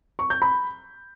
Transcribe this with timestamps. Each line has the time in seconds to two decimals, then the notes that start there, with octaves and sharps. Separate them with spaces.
0.19 C#6
0.30 G6
0.42 B5